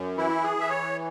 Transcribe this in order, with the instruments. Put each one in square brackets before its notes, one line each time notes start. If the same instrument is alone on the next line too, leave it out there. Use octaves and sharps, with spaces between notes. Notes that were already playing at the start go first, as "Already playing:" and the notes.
Already playing: [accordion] F#2
E3 E4
G#4
E3 E5
C#5